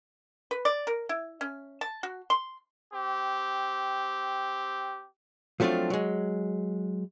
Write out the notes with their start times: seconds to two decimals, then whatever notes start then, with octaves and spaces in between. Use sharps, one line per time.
0.51 B4
0.65 D5
0.87 A#4
1.09 E4
1.41 C#4
1.81 A5
2.03 F#4
2.30 C6
2.93 C4 G4
5.60 F3 F#3 A3 C4 D4 F4
5.90 F#3 G#3